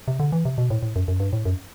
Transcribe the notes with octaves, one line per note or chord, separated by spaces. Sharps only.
C3
D3
E3
C3
B2
A2
A2
F#2
F#2
G2
A2
F#2